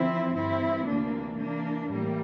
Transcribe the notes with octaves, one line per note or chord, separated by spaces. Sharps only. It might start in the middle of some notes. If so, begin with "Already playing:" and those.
Already playing: E2 D3 F3 C4 E4
G2 E3 C4 E4
D2 C3 E3 A#3 D4
E2 E3 A#3 D4
A2 E3 G3 A#3